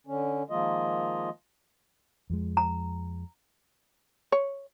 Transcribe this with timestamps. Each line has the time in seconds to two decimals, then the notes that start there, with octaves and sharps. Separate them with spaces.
0.07 D3 C#4
0.50 D#3 F3 G#3 A#3 F4 D#5
2.30 F2 F3 G#3
2.57 A#5
4.32 C#5